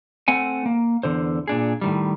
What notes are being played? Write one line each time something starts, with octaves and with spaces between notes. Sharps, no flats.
A3 C4 F#5 G#5
A#3
E2 D3 C5
A#2 D4 G#4
A2 D#3 G3